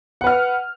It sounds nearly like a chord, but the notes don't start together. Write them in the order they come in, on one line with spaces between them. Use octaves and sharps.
F#5 B4 F6